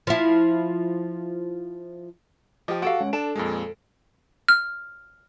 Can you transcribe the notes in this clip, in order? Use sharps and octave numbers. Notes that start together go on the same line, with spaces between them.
F3 E4
F3 G4 D#5 G5 D6
F#4 A4 F5 F#5 D7
G#3 C#4 C#5
D4 A4 A5 D7 E7
F2 A#2 G#3
F6